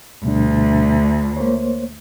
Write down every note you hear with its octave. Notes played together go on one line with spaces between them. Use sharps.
D2 B2 G3 D4
A#3 C5 C#5